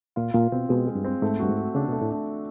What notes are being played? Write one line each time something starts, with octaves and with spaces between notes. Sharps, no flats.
A#2 F4
A#2 F4
B2 C4
B2 G#3
G#3
G2
C4
G#2 A3
G2 F#4
G#2
F#4
C#3 D4
B2 A3
A2
D4